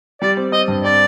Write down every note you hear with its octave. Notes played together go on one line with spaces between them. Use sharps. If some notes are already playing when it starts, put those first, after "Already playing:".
G3 D5
C4
C4 D#5
G2
C4 D5